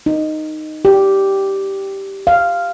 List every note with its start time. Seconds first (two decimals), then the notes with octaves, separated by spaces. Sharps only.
0.06 D#4
0.85 G4
2.27 F5